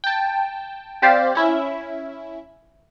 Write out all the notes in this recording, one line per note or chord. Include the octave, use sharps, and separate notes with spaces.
G5 A5
C4 G4 C5 D5 F5
C#4 E4 E5